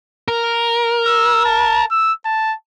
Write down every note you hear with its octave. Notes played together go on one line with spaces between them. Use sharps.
A#4
E6
A5
E6
A5